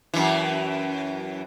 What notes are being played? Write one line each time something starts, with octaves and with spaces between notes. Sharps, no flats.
F#2 E3